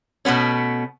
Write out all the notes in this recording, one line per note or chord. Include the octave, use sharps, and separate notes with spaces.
B2 A3 B3 C#4